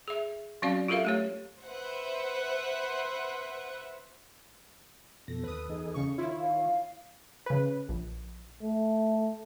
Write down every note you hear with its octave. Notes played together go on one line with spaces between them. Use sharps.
G#4 E5
F#3 C4 C#4 F#4 D5 F5
F4 G4 A4 A#4 E5 F5
A3 G4 C#5
B4 C5 E5 F#5
F2 B2 A4 A#6
D#2 B4 D#6
E2 D#4 G#4
C#3 C#6
D#3 E4 F4 C#5
F5
C#3 B4
A#1
A3